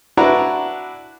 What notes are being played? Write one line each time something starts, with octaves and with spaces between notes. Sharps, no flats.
D4 E4 F#4 B4 A#5